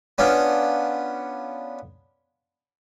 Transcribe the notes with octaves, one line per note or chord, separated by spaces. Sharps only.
B3 C#4 D4 F4